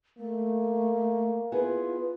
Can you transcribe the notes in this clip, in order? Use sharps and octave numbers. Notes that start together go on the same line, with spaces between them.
A3 A#3
B3 E4 F4 G#4